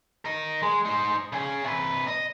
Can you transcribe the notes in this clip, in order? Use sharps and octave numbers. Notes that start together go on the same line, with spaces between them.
A#4 D#5
G#3
D#4 C5
C#3 G#4
C3 B4
D#5